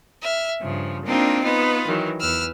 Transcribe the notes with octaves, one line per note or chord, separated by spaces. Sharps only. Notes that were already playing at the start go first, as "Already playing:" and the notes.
E5 F6
G2 C#3 F3
A#3 C4 D4 D#4 F4
B3 D#4 F4 B4
D#3 E3 F#3
E2 B4 E6 F6